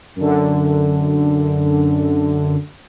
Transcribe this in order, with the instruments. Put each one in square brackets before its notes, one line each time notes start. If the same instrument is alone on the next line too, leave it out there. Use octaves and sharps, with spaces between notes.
[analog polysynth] F#2 D3